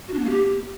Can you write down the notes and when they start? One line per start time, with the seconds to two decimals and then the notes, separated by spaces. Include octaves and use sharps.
0.08 F#4
0.14 D4
0.19 B3
0.24 A#3
0.30 G4